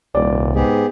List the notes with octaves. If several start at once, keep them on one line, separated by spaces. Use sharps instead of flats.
D#1 C2 D5
G#2 B3 G4 G#4